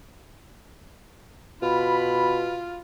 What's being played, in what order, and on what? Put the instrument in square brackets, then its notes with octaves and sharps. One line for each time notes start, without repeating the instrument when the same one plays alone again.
[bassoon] B2 [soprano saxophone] F4 [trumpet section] B5